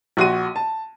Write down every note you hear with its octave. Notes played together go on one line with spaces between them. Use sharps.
A#1 F#4 C6 D#7
A5